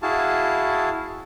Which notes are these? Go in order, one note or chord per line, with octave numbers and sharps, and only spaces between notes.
E4 F#4 G#4 F5 A5